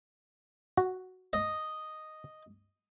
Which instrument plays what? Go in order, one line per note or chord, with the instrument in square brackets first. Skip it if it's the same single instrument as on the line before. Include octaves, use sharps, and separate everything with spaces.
[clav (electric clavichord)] F#4
[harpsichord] D#5